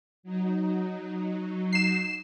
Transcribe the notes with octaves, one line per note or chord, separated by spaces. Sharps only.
F#3 D#4
C7 E7